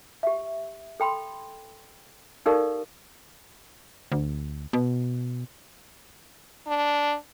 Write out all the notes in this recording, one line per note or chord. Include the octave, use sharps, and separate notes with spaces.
G4 E5
A4 G5 B5 C6
D#4 G4 A4 A#4 D5 F5
D2
B2
D4